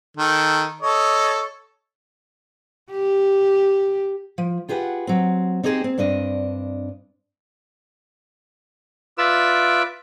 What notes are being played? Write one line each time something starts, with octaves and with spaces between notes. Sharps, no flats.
D#3 A4
A4 C#5 D#5
G4
F3
F4 G4 G#4 B4 F5 F#5
F#3 C4
C4 D#4 G4 G#4 C5
C4
G2 C4 D4 D#5
F4 B4 D5 E5 E6